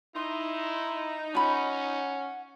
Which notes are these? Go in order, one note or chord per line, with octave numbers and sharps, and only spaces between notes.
D#4 E4 C6
C#4 F4 F#5 B5